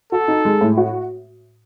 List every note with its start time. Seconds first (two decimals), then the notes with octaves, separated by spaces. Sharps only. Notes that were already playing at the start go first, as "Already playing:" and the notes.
0.12 F#4 A4
0.28 D#4
0.45 G#3
0.61 A2
0.77 F#4